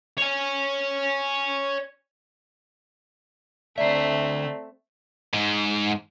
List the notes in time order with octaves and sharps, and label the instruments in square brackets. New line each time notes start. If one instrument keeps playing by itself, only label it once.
[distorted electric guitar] C#5 G#5
[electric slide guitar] D3 E5 [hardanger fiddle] A3 C4 [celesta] D5 A#5 C7
[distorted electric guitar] G#2